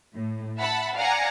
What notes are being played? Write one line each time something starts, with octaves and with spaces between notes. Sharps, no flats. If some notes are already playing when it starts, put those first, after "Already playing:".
A2
E5 F#5 A5 B5
D5 F5 F#5 G#5 A#5